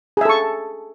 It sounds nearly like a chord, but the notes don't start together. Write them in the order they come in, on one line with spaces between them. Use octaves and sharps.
G#4 E5 A4 C#6